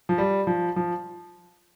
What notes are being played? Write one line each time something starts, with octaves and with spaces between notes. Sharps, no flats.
F3
G3
F3
F3